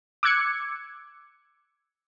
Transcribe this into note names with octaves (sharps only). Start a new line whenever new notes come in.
D6 E6 F#6 G#6 C#7